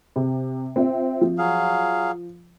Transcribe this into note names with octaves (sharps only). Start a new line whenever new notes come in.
C3
C4 F4 E5
F3
F#3 G#4 F5